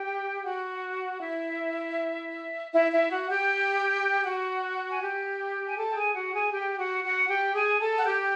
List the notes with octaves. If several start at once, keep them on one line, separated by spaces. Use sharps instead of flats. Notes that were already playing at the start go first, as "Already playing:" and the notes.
Already playing: G4 G5
F#4 F#5
E4 E5
E4 E5
E4 E5
F#4 F#5
G4 G5
F#4 F#5
G#5
G4 G5
G#5
A4 A5
G5
G#4 G#5
F#4 F#5
G#4 G#5
G4 G5
G5
F#4 F#5
F#4 F#5
G4 G5
G#4 G#5
A4 A5
F#5
G4 G5